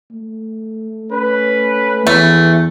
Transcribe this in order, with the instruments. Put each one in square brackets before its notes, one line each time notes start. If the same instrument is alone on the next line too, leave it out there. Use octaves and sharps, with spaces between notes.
[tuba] A3
[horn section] C#4 B4
[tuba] E2 [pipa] A3